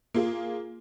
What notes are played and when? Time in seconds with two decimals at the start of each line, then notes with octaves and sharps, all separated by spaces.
0.14 A#3 F4 G#4